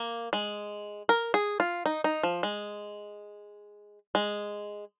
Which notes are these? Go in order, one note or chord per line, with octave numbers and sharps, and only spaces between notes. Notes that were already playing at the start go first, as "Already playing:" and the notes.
Already playing: A#3
G#3
A#4
G#4
F4
D#4
D#4
F3
G#3
G#3